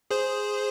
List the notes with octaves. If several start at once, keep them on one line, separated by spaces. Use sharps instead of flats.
G#4 C5